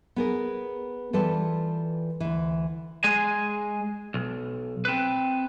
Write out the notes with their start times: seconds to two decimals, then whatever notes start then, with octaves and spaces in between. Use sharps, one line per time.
0.16 B3 G#4 A#4
1.13 E3 G3 F4 A4 B4 A5
2.20 D2 E3
3.04 G#3 G#5
4.14 B1
4.85 C4 B4